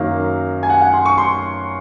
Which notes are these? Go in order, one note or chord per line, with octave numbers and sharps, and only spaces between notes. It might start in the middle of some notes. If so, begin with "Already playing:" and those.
Already playing: F#2 D#3 F#3 A#3 F5
G#5
F#5
F#5
C6
C#6
C6